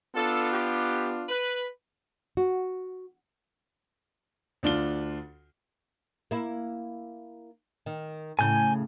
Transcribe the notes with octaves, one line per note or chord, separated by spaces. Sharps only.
B3 D4 F4 A4
G4
B4
F#4
D2 D4 F4 G7
A#3 E4
D#3
A2 C#3 G#5 G6